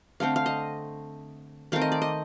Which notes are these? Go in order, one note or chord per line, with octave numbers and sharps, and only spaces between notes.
D3 A3 C4 F5
F5
D#5
D#3 A3 C4 F5
D#5
D5
D#5